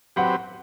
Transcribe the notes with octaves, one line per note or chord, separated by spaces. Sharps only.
F#3 C4 G4 B4 F#5